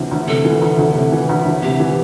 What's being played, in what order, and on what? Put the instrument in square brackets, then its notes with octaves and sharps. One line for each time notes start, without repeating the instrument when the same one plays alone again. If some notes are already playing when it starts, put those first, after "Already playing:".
Already playing: [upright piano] D2 C3 E3
D2
[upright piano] C3 [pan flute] A4
[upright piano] E3
D2
D2
C3
E3
D2
D2
[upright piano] C3 [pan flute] G4
[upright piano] E3